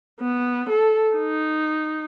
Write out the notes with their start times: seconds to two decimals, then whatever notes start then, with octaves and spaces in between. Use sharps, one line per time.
0.21 B3
0.69 A4
1.17 D#4